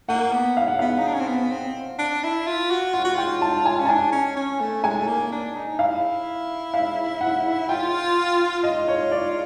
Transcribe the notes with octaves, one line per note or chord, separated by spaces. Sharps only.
A#3 F#5
B3
F5
F#5
B3 F5
D#4
D4
C#4
C4
B3
C4
D4
E4
F4
F#4
F4 F#5
F#4
F4 G5
A5
G#5
C#4
A5
D4 G#5
C#4
C#4
A3
G#3 G#5
A3
A#3
D4
D#4
E4 F5
F5
F#5
F4 G5
F4 D#5
C#5
D5